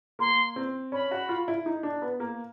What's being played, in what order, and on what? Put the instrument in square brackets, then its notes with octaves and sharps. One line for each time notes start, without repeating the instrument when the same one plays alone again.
[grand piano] A#3 [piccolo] C6
[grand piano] C4
[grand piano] C#4 [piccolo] B5
[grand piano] F#4
F4
E4
D#4
D4
B3
A#3